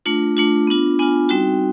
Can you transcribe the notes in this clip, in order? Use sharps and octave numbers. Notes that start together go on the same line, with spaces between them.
A3 D4 F4
A3 D4 F4
B3 D4 F4
B3 D4 F4 G#5
G3 C4 D#4 F#4 G5